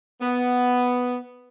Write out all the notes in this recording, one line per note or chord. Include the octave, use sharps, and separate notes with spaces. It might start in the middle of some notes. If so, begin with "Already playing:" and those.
B3